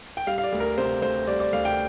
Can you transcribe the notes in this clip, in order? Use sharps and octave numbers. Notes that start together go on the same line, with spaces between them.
G5
G3 F5
F5
D5
D2
A#4
C3 C5
D2 C5
G3 D5
D5
D2 F5
G5